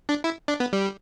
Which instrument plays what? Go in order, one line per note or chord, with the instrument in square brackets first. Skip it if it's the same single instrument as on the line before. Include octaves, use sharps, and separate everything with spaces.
[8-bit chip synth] D4
E4
D4
B3
G3